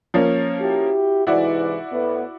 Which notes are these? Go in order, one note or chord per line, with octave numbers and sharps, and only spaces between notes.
F3 A#3 C#4
E4 F#4 G4
G#2 C3 E3 E4 F#4 D5
A2 B3